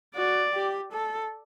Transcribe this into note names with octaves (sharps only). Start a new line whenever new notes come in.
F#4 D5
G4
A4